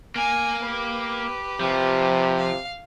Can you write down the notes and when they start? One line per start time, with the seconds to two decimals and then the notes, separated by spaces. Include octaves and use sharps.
0.16 A#3 G#5
0.65 G4 B4
1.60 C3 F3
2.37 F5